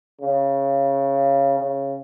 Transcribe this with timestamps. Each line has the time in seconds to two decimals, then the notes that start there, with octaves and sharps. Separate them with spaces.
0.21 C#3
1.58 C#3